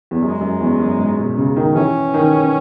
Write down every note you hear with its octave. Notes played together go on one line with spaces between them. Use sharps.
E2
F#2 G#3
F#2
E2
F#2
G#2
B2
C#3
D#3
E3 C#4
D#3